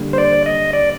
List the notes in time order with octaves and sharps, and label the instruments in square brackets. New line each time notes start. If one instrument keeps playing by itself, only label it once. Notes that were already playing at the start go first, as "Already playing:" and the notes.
Already playing: [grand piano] D3 G3 A#3
[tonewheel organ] C5
D5
D#5
D5